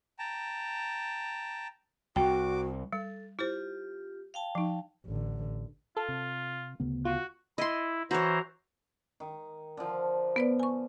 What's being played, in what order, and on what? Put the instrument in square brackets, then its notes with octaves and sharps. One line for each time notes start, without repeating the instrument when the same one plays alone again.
[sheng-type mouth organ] G5 A5 A#5
[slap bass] C2 [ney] F#4 [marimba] G5 [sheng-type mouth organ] D6
[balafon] G3 [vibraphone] A4
[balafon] E4 C5 [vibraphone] F4 G4
[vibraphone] F5 G5 A5
[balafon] F3 D#4
[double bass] A1 D3
[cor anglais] F4 [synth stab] A4
[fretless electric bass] C3
D2 C#3 B3
[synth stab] F4 [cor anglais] F#4
[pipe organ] E4 [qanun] D#5 C6
[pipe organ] E3 C5 A#5 [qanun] F#4 C#5
[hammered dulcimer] D#3
D3 F3
[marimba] B3 B4 D5
G#5 C#6